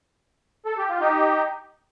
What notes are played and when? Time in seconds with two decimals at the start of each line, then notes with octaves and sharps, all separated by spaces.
0.66 A4
0.77 G4
0.89 F4
1.00 D#4 G4